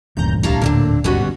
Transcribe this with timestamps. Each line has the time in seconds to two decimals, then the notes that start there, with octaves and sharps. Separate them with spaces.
0.17 D#1 D2 G2 A#2 E3 C#4 A#5 G6
0.43 C2 G3 D4 C#5 F5 A5 A#5
0.62 A2 D3 A#3 C4 D4
1.04 G1 D#2 G#2 B2 G3 B3 C#4 F#4